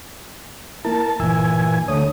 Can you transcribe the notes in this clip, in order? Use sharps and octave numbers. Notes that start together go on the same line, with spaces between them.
A#3 E4 A#4 A5
G1 A#2 E3 G#5 E6
D2 A3 C#5 D#6